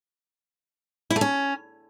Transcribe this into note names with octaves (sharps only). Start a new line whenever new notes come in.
E4
A3
C#4